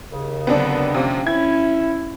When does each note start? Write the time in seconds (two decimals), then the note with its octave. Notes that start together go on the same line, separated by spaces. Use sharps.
0.12 D#2 C#3
0.47 D3 F#3 B3 C4 D4
0.94 C3 F3 A#3 C#4
1.27 C#4 E4 G#6